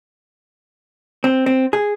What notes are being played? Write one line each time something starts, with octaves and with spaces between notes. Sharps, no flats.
C4
C4
G#4